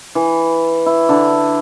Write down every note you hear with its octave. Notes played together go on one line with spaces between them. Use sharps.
E3
E4
D3